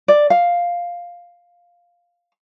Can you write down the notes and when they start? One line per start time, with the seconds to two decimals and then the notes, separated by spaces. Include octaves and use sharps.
0.08 D5
0.30 F5